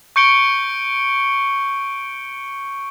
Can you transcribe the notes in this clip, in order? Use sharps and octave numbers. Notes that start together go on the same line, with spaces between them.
C#6 G6 C#7 D7 G7